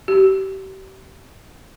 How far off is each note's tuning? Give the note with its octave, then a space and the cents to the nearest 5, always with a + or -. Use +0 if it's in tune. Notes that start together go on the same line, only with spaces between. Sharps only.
G4 -35